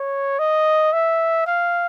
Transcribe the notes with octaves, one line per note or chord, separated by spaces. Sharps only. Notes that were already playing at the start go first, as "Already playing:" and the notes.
Already playing: C#5
D#5
E5
F5